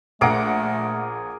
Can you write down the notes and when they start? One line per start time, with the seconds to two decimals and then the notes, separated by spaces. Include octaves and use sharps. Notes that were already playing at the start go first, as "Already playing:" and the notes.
0.21 A#1 A3 G#4 A#4 F#5 D6